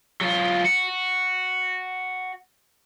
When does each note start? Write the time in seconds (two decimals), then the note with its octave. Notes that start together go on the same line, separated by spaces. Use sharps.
0.21 F#3 F4
0.65 F#4